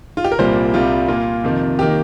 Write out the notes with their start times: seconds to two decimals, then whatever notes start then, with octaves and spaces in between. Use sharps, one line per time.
0.17 F4
0.24 G4
0.32 A#4
0.38 C2 A#2 G3 A#3 C5
0.74 C2 C3 G3 F4
1.08 A#2 A#3 F4
1.44 F2 C3 D#3
1.79 D#3 A#3 G4